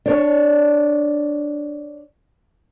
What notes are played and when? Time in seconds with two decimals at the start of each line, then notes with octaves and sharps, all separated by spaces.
0.06 D4 C#5